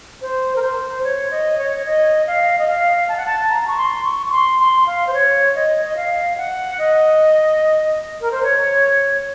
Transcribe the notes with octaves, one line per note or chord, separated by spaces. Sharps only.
C5
A#4
C5
C#5
D#5
C#5
D#5
F5
D#5
F5
A5
F#5
A5
A#5
C#6
C6
C#6
C#6
C6
C6
F5
C5
C#5
D#5
D#5
F5
F#5
D#5
A#4
C5
C#5